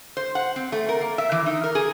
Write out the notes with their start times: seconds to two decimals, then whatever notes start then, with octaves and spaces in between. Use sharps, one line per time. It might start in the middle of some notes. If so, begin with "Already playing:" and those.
0.17 C5
0.35 F#5
0.56 C4
0.72 A3
0.89 A#4
1.01 A#3
1.18 E5
1.32 E3
1.46 D#4
1.64 A#4
1.75 G#4